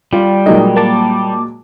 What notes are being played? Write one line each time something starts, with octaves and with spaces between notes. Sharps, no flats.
G3 F4
A#2 F#3 G#3 D#4 D#5
A#3 A5 D6